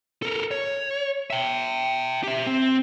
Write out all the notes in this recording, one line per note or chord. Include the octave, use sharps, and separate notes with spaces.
A4 A#4
C#5
E5 G5
G4 E5
C4